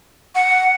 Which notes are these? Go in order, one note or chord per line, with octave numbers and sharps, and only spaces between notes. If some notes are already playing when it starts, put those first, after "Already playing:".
F#5